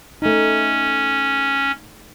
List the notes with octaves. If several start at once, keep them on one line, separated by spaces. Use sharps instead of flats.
A3 C#4 D#4